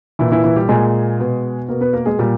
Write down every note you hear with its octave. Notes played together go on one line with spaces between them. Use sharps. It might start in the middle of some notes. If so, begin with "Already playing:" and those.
A#2 E3 E4
E3 E4
E3 E4
G3 G4
A#2 G#3 G#4
B2
B2 A#3 A#4
B3 B4
A#3 A#4
G#3 G#4
A#2 G3 G4